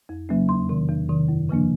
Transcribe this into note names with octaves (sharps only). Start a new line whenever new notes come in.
F2
C#3 F#3 A#3 C#4
E2 C6
C3 D#3
E2
C3 D#3
F#2
C#3 F3 A#3 D4